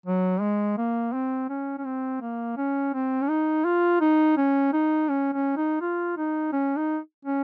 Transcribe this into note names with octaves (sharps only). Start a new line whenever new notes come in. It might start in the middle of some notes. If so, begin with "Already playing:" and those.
F#3
G#3
A#3
C4
C#4
C#4
C4
A#3
C#4
C4
C#4
D#4
F4
D#4
C#4
D#4
C#4
C#4
D#4
F4
D#4
C#4
D#4
C#4